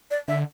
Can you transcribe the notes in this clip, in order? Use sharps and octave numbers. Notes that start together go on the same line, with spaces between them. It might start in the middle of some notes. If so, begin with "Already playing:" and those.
D5
D3 E5